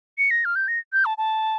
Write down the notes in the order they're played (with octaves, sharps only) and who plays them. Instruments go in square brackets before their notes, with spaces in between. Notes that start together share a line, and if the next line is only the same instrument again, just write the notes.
[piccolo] C#7
A#6
F6
G6
A#6
G6
A5
A5